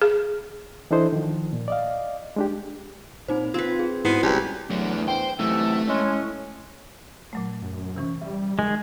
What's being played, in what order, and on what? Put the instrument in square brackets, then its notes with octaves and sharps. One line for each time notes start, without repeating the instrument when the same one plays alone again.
[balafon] G#4
[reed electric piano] E3 D4 E4 A4 C5 D#5
D#3 F3
A#2
D5 D#5 F5
G#3 D4 G4
[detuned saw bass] A#2 [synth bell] C4 D#4 C5
[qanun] C4 B4 [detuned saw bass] F4 [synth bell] G#6
[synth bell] G#4
[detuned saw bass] G#2 [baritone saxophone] B3 [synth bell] E4 F#4 [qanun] C5 G#5
[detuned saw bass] F1 [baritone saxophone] C#2 [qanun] G3
[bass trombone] E2 [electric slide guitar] F#3 [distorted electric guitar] A3 D4
[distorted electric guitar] C5 [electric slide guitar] G5
[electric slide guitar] F#2 E3 [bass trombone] C3 [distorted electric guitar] A3 [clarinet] E6
[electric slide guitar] A2 [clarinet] G#3 [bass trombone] C#4
[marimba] A#2 F#3 A3
[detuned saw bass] F#2
[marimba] C3 E3 C#4
[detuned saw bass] G3 [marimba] E5
[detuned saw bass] D#3 [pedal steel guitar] G#3